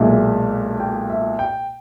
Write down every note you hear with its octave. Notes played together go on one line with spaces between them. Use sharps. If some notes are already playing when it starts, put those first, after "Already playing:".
Already playing: B1 A#2 G#3 E5
G5
E5
G5